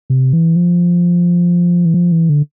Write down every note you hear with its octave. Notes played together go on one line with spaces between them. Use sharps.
C3
E3
F3
E3
F3
E3
D3